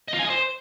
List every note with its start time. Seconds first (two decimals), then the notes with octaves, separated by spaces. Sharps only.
0.08 D#5
0.14 F4
0.19 G#5
0.24 D#5
0.30 C5